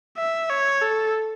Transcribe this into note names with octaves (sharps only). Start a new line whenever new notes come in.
E5
C#5
A4